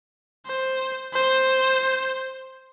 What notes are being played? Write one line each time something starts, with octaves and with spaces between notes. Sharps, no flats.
C5
C5